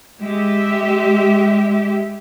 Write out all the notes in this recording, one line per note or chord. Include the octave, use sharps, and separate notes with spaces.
G#3 G4 E5